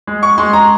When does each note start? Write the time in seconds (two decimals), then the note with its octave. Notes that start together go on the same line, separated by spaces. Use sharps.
0.07 G#3
0.23 C#6
0.38 G#3 C6
0.53 A#5